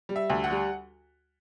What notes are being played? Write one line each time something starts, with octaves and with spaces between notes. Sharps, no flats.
G3
E5
D2
F#5
G3